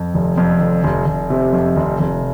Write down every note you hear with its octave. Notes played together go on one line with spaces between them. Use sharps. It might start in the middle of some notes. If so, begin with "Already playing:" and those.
Already playing: F2
F1
F2
F1
F1
F1
C3
F2
F1
F1